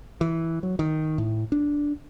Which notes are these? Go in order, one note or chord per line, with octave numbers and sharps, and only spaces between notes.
E3
F#3
D#3
A2
D4